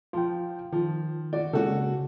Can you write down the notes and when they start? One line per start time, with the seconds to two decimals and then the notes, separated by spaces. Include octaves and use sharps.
0.13 F3 F4 G5
0.72 D#3 F3
1.33 F#4 D5
1.53 C#3 G#3 A#3 F#4 A4